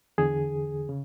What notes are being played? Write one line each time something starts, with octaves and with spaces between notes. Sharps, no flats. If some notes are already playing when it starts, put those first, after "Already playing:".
E2 D3 G#4
C#3